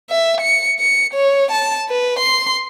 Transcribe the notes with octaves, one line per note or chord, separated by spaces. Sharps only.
E5
C#7
C#7
C#5
A5
B4
C6